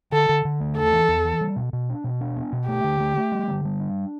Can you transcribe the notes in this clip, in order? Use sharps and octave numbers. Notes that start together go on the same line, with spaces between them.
D3 A4
D3
D3
A3
E2 A4
E3
E2
E3
G3
B2
B2
D4
B2
D4
B3
B2
A3 G4
D3
A3
A3
G3
D3
G3
D4